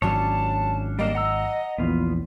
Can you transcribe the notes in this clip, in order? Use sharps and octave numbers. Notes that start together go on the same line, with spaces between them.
G#1 F#3 C#4 D4 C#5 A5
G3 A#3 D4 D#5
F#5 A#5 E6
A#1 E2 B3 F4